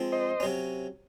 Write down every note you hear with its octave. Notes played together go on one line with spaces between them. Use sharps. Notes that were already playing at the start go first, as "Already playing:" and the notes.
Already playing: F3 G#3 C4
C5 D#5
C3 F#3 C#4